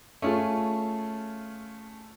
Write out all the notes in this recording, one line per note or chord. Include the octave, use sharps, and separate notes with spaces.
A3 C#4 F4 G#4